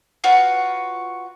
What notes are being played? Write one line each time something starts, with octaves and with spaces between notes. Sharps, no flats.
F4 F#4 B4 C#5